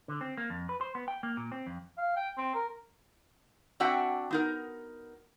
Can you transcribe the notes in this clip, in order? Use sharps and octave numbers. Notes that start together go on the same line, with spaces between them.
D3
C4
A#3
F2
B4
C5
B3
G5
A#3
A#2
C4
F2
F5
G5
C4
A#4
C4 D4 F#4 E5 F#5 G5
B3 D#4 A#4